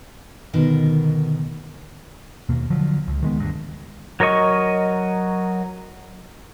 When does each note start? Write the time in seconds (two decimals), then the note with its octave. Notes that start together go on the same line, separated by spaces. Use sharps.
0.53 D2 B2 D#3 A#4
2.49 D#2 B2 A#3
2.70 D3 F3 F#3
3.07 C#2
3.23 D#3 G#3 B3
3.40 D2 G2
4.20 F#3 A#4 C#5 D#5 C#6